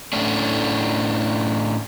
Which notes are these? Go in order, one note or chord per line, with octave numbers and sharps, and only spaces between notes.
A2 A3 C#4 D4